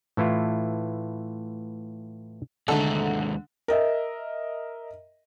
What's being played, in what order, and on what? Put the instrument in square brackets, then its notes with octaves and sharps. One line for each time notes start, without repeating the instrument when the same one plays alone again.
[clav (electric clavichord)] A2 E3 E4 F4
[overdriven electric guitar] D#2 G#3 [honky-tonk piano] D3 [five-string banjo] A3 D#4 A4
[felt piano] A#4 D#5 E5